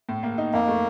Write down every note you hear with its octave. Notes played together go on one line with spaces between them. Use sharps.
A2
A#3
D#4
F2 A#3
A3